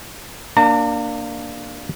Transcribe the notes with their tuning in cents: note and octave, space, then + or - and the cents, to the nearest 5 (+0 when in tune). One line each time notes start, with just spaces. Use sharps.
A#3 +0 D4 +5 A#5 -40